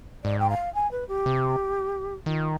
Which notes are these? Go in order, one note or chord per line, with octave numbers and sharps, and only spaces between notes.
G#2 D5
G5
F5
G#5
B4
G4
C3
D#3 F4